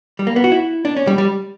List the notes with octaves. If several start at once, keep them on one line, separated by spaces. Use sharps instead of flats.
G3
A#3
B3
F#4
E4
D4
C#4
G3
G3